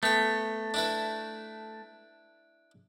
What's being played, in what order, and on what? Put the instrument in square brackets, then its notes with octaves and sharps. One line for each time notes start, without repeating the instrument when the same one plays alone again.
[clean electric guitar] A3 [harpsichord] B3 G5
[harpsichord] D4 E4 B4